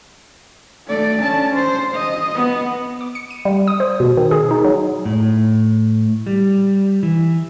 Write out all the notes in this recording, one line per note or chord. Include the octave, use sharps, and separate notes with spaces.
A3 D5
C#4 A5
C5
D#5
B3
D6
C#7
D#7
G3
D#6
C5
B2
D#3
G#4
D#4
F#3
A2
G3
E3